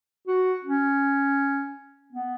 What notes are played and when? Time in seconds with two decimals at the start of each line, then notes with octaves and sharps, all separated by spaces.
0.27 F#4
0.65 C#4
2.13 B3